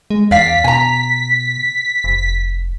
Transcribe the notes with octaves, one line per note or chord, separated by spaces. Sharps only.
G#3
E2 D5 F5 B6
B2 G#5 A#5
F1